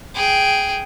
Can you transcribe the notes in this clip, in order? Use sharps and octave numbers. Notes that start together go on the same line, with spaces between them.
G#4 G5